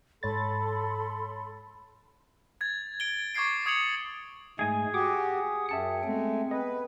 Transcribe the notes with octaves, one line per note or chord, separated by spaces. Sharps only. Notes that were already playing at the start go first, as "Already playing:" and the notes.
G#2 A4 C#5 B5 C6 A6
G#6 A6
D7 G7
C#6 D6 G#6 A6 C7 D7
C#6 D#6 G#6 C#7 F7 F#7
G#2 G#3 A3 G#4 G#5
F#4 G4 F#5 D6 D#6
F#2 C#4 E5 G5 A5 C#7
G#3 A3 B3 C4
B4 D#5